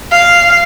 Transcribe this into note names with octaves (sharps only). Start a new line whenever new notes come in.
F5